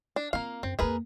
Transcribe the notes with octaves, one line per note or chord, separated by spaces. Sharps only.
D4
A#3 C4 F4 F5
F#2 C4
F2 A#3 G#4 A#4 B4